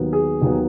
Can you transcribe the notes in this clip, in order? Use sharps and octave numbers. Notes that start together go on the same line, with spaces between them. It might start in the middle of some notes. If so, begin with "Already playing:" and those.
Already playing: D#2 D#3 F#3 B3
G#4
D#2 D#3 F#3 B3